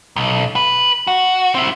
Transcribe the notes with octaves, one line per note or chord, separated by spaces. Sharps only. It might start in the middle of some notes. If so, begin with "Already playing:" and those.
B1
B4
F#4
C4 E4